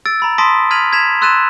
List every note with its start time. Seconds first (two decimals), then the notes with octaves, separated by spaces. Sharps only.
0.06 E6 A6 D7
0.20 A#5 B5 E6
0.38 A5 C6 D#6 A#6 B6 D7
0.71 F6 G#6 B6 D#7 F7 F#7
0.93 G#6 B6 E7 F7
1.21 C6 E6 F#6 A6 D#7 E7